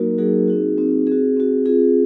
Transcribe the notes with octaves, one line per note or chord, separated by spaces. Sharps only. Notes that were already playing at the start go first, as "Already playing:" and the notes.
Already playing: F#3 A#3 D#4 F#4 A#4
F#3 A#3 D#4 F#4 G#4
C4 D#4 F#4
C4 D#4 F#4
C4 F#4 G#4
C4 F#4
C4 F4 G#4